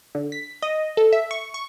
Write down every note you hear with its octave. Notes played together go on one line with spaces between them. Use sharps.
D3
B6
D#5
A4
E5
C#6
C#6